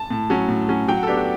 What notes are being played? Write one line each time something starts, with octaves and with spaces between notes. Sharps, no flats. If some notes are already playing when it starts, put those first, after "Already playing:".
Already playing: A5
A2
F#3 C#4
A2
F#3 C#4
F#3 G5
F#5
A4
B3 D4 G4
F#4